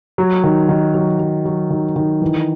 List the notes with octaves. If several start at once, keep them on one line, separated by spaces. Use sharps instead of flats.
F#3
D#3
D#3
F#3
F#3
F#3
D#3
D#3
E3